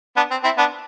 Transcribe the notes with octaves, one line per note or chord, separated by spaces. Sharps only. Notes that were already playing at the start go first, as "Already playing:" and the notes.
B3 D4
C4
C4 E4
B3 D4